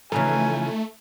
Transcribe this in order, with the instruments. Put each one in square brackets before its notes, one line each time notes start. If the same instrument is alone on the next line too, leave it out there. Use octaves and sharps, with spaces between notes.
[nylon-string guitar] C#3 E3 F3 [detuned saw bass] A3 [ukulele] D#4 B4 A#5 [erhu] G#5